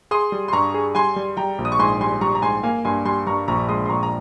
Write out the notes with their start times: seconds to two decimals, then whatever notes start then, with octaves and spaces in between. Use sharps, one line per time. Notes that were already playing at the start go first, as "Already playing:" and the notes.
0.11 G#4 C6 D#6
0.32 G3
0.48 C6
0.53 G2 A#5 C#6
0.74 G#4
0.95 G3 G#5 C6
1.16 G3
1.37 G3 G5 A#5
1.59 A#1
1.65 D#6
1.72 C#6
1.79 G#2 G#5 C6
2.01 G3 G#5 C6
2.21 G3 A#5 C#6
2.35 A#5
2.42 G#2 G#5 C6
2.63 A#3 F5 G#5
2.85 G2 G#5 C6
3.05 G3 G#5 C6
3.27 G2 A#5 C#6
3.48 A#1 A#5 C#6
3.69 G#3 C6 D#6
3.85 C6
3.89 A#1 A#5 C#6
4.03 A#5